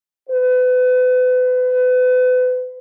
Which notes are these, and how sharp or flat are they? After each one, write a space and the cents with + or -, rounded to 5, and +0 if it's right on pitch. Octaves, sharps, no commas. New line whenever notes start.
B4 +35